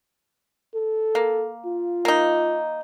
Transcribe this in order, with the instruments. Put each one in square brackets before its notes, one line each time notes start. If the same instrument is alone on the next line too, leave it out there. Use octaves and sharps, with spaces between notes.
[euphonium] A4
[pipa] A#3
[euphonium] F4
[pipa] A#3 D#4